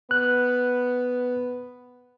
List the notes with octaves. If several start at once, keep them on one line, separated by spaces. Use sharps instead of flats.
B3 F#6